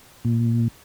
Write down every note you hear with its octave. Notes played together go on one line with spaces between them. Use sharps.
A#2